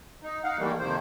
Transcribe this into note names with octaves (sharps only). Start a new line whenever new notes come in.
D#4
D#4 F5 F#5
D#3 E3 G3 A3 A#3
F2 C3 D#3 A#3 C5